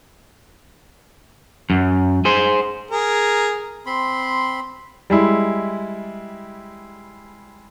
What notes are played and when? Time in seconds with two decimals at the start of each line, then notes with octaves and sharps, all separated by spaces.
1.70 F#2
2.25 G#4 C5
2.91 G#4 A#4
3.86 C4 B5 C6
5.10 G3 G#3 E4